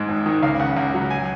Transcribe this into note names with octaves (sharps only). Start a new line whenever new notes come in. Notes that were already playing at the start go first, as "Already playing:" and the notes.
Already playing: G#2 G#3 D#5
G#1
D#3
C#2 F5
C#3 F#5
C#2
F#3
G#5